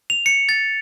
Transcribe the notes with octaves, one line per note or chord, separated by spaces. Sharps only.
F7
C#7
A6